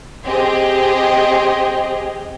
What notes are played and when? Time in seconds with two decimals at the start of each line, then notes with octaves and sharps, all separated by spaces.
0.24 C4 G4 G#4 D#5